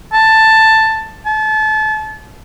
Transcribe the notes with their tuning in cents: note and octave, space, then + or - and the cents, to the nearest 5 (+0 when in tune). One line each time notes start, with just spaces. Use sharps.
A5 +5
A5 -30